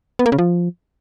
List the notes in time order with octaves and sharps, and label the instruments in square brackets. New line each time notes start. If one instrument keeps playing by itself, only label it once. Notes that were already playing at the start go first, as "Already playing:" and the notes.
[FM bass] B3
A#3
C#3
F3